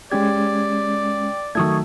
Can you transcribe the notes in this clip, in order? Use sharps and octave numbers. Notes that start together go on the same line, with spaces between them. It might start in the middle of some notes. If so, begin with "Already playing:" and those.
G#3 C#4 G4 D5 G#6
D#3 F#3 A3 C#6 D#6 G#6